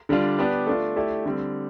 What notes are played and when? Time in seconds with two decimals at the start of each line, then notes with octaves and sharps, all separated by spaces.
0.09 D3 G3 D4 F4
0.39 B3 D4 G4 B4
0.67 A3 D4 F4
0.96 A3 E4 G4 D5
1.26 D3 G3 C4